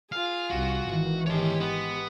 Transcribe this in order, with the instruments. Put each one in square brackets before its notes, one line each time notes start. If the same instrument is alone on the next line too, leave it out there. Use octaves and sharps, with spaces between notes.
[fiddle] F4 G#4 [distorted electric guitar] F5
[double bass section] C2 [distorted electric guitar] F#4
[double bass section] G#1 D#3 E3
[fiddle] G#3 G4 [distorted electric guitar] C#5 A5
[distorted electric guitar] B3